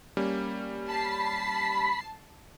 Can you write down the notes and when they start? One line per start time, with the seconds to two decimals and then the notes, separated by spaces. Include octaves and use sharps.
0.17 G3 A#3 C#4
0.89 A5 B5 C7